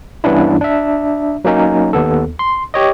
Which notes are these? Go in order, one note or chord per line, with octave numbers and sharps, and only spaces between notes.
G2 E3 B3 C#4 D4 E4
D4 E5
F#3 A#3 C#4 D#4
D#2 B3 A4
C6
G4 C#5 D#5